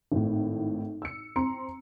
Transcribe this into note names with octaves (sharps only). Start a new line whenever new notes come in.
G#1 A2
E6 C#7
C4 A#5 C6 C#7